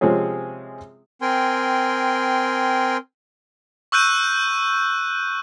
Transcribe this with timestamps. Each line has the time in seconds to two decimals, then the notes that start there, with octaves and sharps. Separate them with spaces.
0.01 C3 F3 G#3 C4 C#4 G#4
1.22 C4 A#4 G5 G#5 C6
3.92 C#6 E6 F#6 G6 D#7